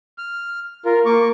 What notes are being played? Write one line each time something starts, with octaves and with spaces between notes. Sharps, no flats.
F6
F4 A#4
A#3 C#6 D6